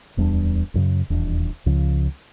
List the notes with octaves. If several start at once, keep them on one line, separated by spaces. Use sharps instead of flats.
D1 E2 G3 D4
A1 F#2 C#3
D#1 E2 D4
C#2 C#3 F3